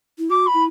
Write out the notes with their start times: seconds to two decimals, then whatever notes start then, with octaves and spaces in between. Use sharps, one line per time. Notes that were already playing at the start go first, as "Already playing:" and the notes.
0.18 E4
0.30 F#4 D6
0.46 B5
0.54 E4